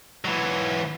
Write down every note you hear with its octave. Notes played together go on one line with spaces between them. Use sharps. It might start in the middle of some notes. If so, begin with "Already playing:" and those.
E3 F#3